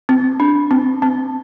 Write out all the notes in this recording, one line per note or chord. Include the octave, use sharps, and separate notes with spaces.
C4
D4
C4
C4